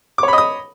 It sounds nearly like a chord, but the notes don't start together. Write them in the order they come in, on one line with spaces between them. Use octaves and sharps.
D6 C#5 B5 D#5 D#6